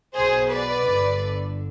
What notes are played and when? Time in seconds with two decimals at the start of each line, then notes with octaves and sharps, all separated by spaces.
0.16 B1 B2 G#4 C5
0.51 B4 D5
0.85 G1 G2 D3